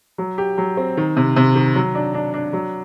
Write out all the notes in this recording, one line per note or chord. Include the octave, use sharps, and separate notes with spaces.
F#3
G4
F#3
C4
D#3
C3
C3
D#3
F#3
D4
D4
D4
F#3